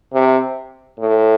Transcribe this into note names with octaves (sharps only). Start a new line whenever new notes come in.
C3
A2